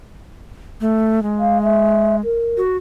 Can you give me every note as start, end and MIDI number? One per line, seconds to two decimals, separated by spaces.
0.81 1.22 57
1.23 2.21 56
1.40 1.62 77
1.63 2.17 76
2.24 2.61 70
2.57 2.77 66